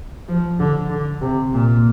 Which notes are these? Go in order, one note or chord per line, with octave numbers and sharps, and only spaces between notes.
F3
D3
D3
C3
A#2